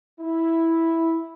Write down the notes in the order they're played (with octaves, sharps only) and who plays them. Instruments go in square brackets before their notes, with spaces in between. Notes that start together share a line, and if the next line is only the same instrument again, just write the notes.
[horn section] E4